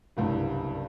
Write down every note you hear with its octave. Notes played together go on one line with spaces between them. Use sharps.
F#1 C2 G2